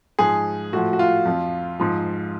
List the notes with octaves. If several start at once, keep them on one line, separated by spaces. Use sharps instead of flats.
G#2 F3 G#4
A2 F3 F#4
F#4
F4
F2 F3
G#2 F3